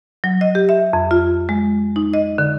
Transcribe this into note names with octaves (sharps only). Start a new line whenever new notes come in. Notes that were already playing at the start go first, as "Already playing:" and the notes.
F#3
D#5
G4
E5
F2
F4
G#3
D#4
D#5
D3